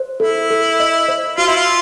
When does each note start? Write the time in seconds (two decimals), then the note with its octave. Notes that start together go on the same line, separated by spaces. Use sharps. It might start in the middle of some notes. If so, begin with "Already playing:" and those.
Already playing: C5
0.20 E4 A4
0.50 A4
0.80 D#5
1.08 C5
1.38 F4 F#4
1.47 E4
1.57 F4